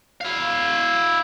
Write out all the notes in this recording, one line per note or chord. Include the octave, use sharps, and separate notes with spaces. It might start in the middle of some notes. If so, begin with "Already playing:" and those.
E4 F5